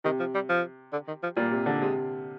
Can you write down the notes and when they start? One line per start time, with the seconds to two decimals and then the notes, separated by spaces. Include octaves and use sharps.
0.04 C3 D#3
0.19 F3
0.34 G3
0.49 F3
0.92 D3
1.07 D#3
1.23 F3
1.36 A#2 G3
1.51 C3
1.66 D3
1.80 C3 G#3